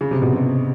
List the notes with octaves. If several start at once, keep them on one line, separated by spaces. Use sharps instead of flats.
C#3
C3
B2
C3